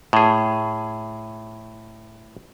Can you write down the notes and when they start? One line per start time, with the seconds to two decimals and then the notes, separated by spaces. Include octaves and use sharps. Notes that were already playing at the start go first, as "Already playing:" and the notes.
0.13 A2 G#4